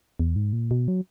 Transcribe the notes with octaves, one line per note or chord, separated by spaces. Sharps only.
E2
G#2
A#2
B2
F#3